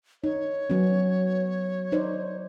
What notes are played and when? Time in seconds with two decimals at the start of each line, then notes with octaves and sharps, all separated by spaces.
0.24 D#4 C#5
0.70 F#3 B3 C#4
1.92 D#4 C5 D5